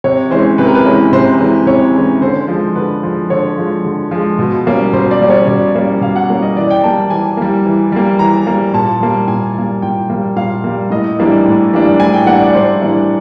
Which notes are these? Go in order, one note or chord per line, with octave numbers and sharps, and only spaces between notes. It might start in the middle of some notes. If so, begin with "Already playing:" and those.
C3 C#5
E3 G#3 C#4 C5
C3 B4
A#4
B4
E3 G#3 C#4
C3 C5
E3 G#3 C#4
C3 C#5
E3 G#3 C#4
D3 C5
F3 G#3
D3 B4
F3 G#3
D3 C#5
F3 G#3
D3
F3 G#3
B2
G3 A#3 C#4
B2 C5
D5
G3 A#3 C#4
C#5
B2 D5
G3 A#3 C#4
B2 F5
F#5
G3 A#3 C#4
D#5
E3 D5
G5
G3 A#3 A5
E3 G#5
G3 A#3
E3
G3 A#3
E3 A#5
G3 A#3
A#2 A5
G3 A#3
A#2 G#5
G3 A#3
A#2 G5
G3 A#3
A#2 F5
G3 A#3
A2 D#5
E3 G3 A#3 D4
A2
E3 G3 A#3 D4
A2 G#5
G5
E3 G3 A#3 D4 F#5
D5
A2 C5
E3 G3 A#3 D4